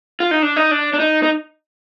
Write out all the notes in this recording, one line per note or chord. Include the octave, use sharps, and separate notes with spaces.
F4
D#4
D4
D#4
D4
D4
D#4
D#4